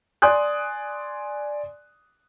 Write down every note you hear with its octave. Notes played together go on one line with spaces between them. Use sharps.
D5 G#5 C6 D#6 F#6